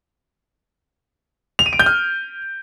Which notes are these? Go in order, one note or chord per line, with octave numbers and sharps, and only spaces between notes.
F7
D#7
D7
G6
F6